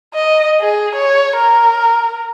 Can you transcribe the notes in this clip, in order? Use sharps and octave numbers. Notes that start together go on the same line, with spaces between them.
D#5
G#4
C#5
A#4